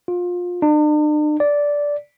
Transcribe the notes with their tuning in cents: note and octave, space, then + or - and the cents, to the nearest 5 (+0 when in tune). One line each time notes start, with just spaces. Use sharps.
F4 +25
D4 +45
D5 -10